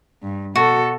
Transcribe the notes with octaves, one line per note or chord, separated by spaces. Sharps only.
G2
B2 F#4 A4